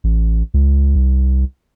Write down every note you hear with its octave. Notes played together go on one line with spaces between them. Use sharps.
A1
C#2
C2